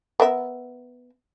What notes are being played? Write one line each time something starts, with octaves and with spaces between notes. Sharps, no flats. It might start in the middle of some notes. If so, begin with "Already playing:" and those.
B3 A#4 E5